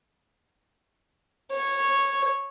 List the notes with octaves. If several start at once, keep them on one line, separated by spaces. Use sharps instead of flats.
C#5